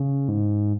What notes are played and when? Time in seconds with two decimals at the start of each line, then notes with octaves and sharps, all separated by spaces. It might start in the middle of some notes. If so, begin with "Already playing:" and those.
Already playing: C#3
0.28 G#2